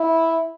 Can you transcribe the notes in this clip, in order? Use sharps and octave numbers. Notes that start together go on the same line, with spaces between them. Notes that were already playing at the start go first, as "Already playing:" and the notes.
Already playing: E4